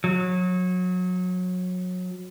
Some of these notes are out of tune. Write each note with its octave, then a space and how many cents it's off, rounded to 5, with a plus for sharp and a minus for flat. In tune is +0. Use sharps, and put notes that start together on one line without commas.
F#3 -25